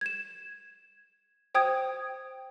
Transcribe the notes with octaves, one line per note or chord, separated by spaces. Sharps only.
G#6 E7
C5 G5 D#6 G#6